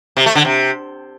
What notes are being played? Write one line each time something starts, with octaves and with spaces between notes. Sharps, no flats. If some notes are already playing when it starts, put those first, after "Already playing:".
C3
A3
D3
C3